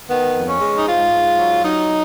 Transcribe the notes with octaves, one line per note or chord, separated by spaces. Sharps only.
D#3 B3
F2
C#4
G#3
D#4
G#2 F4
G#2
F#3
F#3 D#4